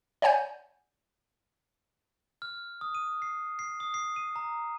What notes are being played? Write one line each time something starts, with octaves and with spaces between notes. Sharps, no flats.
C#5 D5 F#5 G#5 G6
F6
D#6
D#7
C7
C7
D#6
C7
D#7
A#5